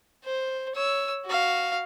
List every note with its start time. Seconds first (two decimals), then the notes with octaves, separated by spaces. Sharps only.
0.24 C5
0.75 C#5 E6
1.26 F#4 F5